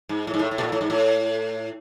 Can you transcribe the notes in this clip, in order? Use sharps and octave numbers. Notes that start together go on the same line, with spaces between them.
G#2
A2
G#2
A2
A2
B2
A#2
A2
G#2
A2